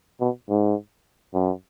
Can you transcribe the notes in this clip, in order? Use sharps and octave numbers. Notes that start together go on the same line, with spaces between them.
B2
G#2
F#2